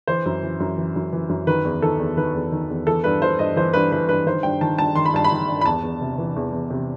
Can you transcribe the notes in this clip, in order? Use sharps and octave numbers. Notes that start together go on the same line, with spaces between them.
E3 C5
F#2
E3
F#2
E3
F#2
E3
F#2
D#3 B4
E2
D#3 A4
E2
D#3 B4
E2
D#3
E2
E3 A4
G2 B4
E3 C5
G2 D#5
E3 C5
G2 B4
E3 B4
G2 B4
D#3 C5
G2 G5
D#3 A5
G2 A5
D#3 C6
B5
G2 A5
B5
D#3
G2
B5
E2 A5
E2
C3
E3
E2
E2
C3